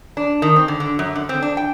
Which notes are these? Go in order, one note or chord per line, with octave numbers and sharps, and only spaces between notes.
D4
D#3
C4
D3
D3
F#2
D3
C4
D4
G5